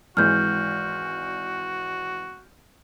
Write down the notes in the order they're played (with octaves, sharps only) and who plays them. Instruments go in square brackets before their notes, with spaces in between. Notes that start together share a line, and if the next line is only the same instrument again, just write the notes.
[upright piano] G#1 E3 G#3 [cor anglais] F#4 [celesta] F6 G6